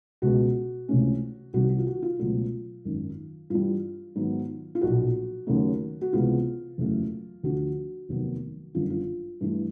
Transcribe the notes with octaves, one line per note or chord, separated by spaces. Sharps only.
C#2 B2 G#3 F#4
C#2 C3 E3 A3 C#4
C2 C3 D#3 G3 F#4
F#4
F4
F#4
F4
C#2 B2 F#3 A3 F4
G#1 F#2 D#3
G2 E3 G3 F4
G#2 D#3 F#3 B3
F4
B1 A#2 F3 F#4
D#2 C#3 F#3 A3
F#4
C#2 C3 E3 G#3 B3 F4
F#1 E2 C#3 F#3 A3
D2 D3 F3 F#4
F1 D#2 D#3 F#3 B3
G1 F#2 D3 F4
F4
G2 E3 A3